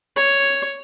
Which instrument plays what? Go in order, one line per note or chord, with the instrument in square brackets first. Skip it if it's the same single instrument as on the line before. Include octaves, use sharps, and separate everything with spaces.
[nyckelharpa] C#5